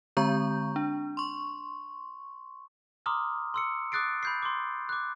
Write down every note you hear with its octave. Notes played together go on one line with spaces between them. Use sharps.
D3 G#3 C4 A#5 C#6 G6
D4
C6 C#6
A#5 C6 D6 D#6 F6
C6 E6 C#7
D6 D#6 F#6 A6 C7 D7
B5 G6 C7
C6 D6
D6 F#6